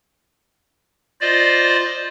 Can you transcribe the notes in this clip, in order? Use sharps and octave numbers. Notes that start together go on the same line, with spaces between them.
F4 C5 D5 D#5